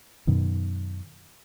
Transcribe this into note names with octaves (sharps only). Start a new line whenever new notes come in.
F#2 B2 D#3